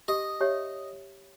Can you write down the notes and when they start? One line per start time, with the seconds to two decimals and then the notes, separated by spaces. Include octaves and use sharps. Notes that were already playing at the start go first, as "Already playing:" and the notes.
0.08 G4 D#5
0.41 G4 C#5 E5